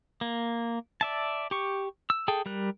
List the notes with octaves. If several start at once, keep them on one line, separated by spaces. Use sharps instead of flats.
A#3
D5 E5 A5
G4 C#6
E6
G#4 A4 G5
G3 A#4 F#6